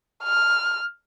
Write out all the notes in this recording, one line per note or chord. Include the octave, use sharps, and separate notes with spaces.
F6